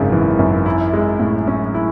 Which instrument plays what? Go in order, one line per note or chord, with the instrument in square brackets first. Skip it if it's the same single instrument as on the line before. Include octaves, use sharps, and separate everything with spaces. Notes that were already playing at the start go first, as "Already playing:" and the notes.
Already playing: [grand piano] G#1 F#2 C#3
E3
F#2
E4
G#3
A2
C#4
E4